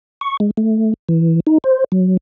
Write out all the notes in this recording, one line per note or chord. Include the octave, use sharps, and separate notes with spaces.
C#6
G#3
A3
E3
D#4
C5
F#3